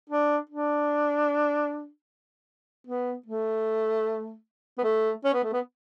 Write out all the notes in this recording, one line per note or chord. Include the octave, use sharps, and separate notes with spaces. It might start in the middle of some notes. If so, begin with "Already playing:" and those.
D4
D4
B3
A3
B3
A3
C#4
B3
A3
B3